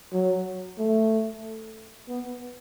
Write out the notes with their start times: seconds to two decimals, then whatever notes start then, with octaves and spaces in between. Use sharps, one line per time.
0.13 F#3
0.79 A3
2.09 B3